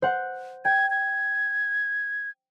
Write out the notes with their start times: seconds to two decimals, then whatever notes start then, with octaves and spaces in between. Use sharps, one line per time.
0.02 C5 F#5
0.65 G5 G#6
0.90 G#6